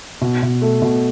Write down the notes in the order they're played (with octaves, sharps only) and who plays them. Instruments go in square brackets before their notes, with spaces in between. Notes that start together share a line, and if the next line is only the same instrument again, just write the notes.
[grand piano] B2
B2
A3
B2